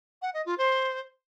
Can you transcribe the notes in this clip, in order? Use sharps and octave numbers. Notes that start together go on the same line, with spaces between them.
F#5
D#5
F4
C5